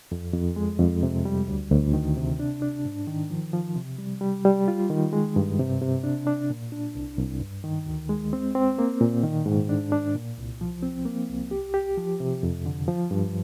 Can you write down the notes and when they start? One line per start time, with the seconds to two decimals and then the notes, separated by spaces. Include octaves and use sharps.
0.12 F2
0.34 F2
0.56 G#3
0.79 F2
1.03 C3
1.25 G3
1.48 D2
1.71 D2
1.94 D#3
2.17 C3
2.40 D4
2.62 D4
2.85 G#2
3.07 D#3
3.30 F3
3.53 F3
3.76 C3
3.98 G3
4.21 G3
4.45 G3
4.68 F4
4.90 D#3
5.13 G#3
5.36 G2
5.59 C3
5.82 C3
6.04 D4
6.27 D4
6.50 A#2
6.72 D4
6.95 C2
7.18 C2
7.41 G2
7.64 D#3
7.86 D2
8.09 G#3
8.33 C4
8.55 C4
8.79 A#3
9.01 A#2
9.23 D#3
9.46 G#2
9.69 D4
9.92 D4
10.15 A#2
10.38 C2
10.61 F3
10.83 C4
11.06 A#3
11.30 C2
11.51 G4
11.74 G4
11.97 F3
12.20 C3
12.43 F2
12.66 D3
12.88 F3
13.11 G2